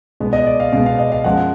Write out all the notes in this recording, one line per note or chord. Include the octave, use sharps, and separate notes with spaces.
B2 G#3 B3
D#5
D5
F5
B2 G#3 B3 F5
F5
D#5
F5
F#2 F3 G#3 F#5